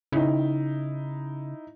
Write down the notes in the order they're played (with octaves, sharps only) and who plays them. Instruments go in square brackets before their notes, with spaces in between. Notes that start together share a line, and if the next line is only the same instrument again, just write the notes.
[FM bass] C#3 [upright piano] D#4 E4